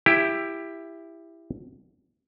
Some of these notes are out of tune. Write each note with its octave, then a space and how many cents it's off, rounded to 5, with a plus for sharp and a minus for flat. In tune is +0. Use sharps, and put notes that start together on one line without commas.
E4 +10 G4 +15